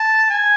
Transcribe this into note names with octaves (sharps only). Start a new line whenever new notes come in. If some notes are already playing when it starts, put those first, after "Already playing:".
Already playing: A5
G#5